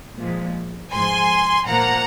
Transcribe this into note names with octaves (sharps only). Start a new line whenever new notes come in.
A#2 F3 G#3
G#2 F3 G#3 G#5 C6
A#2 F3 A#3 F#5 A#5